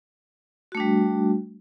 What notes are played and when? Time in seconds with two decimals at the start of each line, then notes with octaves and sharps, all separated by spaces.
0.72 F#4
0.75 A3
0.77 D4
0.80 G3